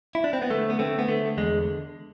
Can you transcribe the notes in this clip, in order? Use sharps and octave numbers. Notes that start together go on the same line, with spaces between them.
E4
D4
C4
B3
D3 A3
B3
D3 A3 C4
B3
D3 A3
E2 G#3